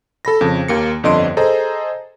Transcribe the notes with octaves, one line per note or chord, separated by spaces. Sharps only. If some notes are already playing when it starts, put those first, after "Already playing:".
A4 B5 A#6
F2 C#3
D#2 A#3 C#7
G1 F2 D3 D#5 C6 D7
G#4 A4 C5 D#5 A#5